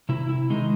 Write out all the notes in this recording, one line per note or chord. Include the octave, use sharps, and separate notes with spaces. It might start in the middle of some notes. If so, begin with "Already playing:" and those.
C3 E4
E4
D#3 G#3 D#4